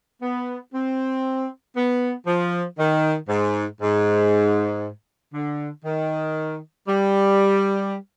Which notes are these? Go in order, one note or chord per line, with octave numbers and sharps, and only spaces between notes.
B3
C4
B3
F3
D#3
G#2
G#2
D3
D#3
G3